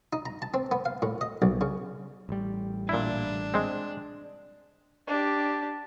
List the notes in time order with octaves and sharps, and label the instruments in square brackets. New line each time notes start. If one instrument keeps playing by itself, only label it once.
[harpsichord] D#4
A#5
A5
C4
B3
F5
A2
D#5
B1
C#3
[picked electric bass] A1 G3
[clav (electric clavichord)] A#2 E4 [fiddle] D4
[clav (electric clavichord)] G#3 C4
[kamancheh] D4 G4